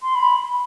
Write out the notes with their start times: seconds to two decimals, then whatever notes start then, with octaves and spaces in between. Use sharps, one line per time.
0.03 C6
0.15 B5